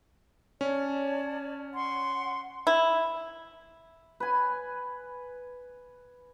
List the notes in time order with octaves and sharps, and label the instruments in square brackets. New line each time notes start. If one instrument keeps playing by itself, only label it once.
[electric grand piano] C#4 [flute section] C#5 D5 A5
[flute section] F#5 C6 C#6
[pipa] E4
[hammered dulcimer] B4 G#5